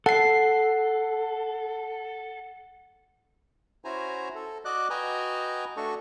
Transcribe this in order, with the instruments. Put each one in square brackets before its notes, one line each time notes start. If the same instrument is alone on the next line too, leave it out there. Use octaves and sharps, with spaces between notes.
[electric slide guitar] A4 [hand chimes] F#5 C7
[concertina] C#4 E4 F#4 C5 G#5 A#5
A4
F#4 D5 D#5 D6 F#6
F#4 B4 D#5 G5 G#5 A#5
A3 D4 F#4 A4 C#6